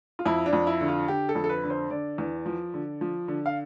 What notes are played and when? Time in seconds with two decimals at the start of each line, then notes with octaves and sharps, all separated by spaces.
0.19 F4
0.26 F2 E4
0.46 D4
0.53 F2
0.67 E4
0.81 D3
0.88 F4
1.08 D3 G4
1.29 A4
1.35 F2
1.44 A4
1.49 B4
1.63 D3
1.70 C5
1.90 D3 D5
2.18 E2
2.46 F3
2.74 D3
3.01 F3
3.28 D3
3.46 F5